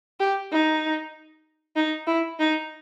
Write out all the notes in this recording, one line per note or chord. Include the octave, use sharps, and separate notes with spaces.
G4
D#4
D#4
E4
D#4